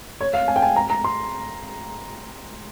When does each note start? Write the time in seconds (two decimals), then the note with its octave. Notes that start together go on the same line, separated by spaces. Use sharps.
0.21 C#5
0.33 F5
0.48 G#5
0.56 G5
0.62 G#5
0.76 A#5
0.90 A#5
1.04 C6